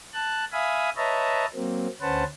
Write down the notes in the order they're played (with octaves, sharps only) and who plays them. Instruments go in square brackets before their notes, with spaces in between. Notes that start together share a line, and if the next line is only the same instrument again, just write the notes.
[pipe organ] A5 F#6
E5 F5 G#5 B5 D#6
B4 C#5 D#5 E5 A5 A#5
F#3 A#3 C4
D2 C#4 B4 C5 F#5 A5